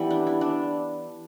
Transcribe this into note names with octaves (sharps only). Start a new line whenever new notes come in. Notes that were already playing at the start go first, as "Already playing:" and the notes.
Already playing: E3 G3 B3 E4
D4
E4
D4